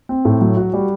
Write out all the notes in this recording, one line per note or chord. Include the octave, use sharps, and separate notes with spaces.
C4
A2
F#3
F#4
G3